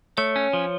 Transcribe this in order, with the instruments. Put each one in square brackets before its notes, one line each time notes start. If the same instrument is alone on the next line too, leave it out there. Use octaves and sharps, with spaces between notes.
[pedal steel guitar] A3 [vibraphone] C#5
[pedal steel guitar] C#4
F3